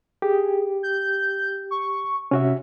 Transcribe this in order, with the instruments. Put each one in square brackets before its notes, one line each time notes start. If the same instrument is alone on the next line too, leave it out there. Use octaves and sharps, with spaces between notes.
[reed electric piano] G4 [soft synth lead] G#4
[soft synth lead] G6
C#6
[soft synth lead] C3 [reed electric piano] C#4 F#4 E5